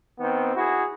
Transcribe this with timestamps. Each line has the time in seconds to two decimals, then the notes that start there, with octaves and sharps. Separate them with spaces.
0.20 D#3 B3 C4
0.55 E4 F#4 G#4